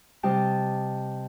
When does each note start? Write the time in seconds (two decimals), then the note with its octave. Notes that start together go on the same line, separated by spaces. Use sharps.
0.23 C3 G3 G4 D#5 G5 A5